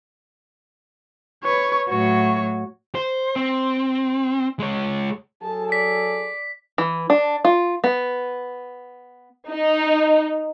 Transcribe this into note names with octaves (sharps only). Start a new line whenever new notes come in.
B4 C#5
A2 F#3 F#4 C#5
C5
C4
G#3 C#5
F#3 G#4 A4 A5
D5 B6
E3
D4
F4
B3
D#4